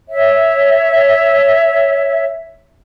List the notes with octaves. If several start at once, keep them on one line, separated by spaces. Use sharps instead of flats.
C#5 E5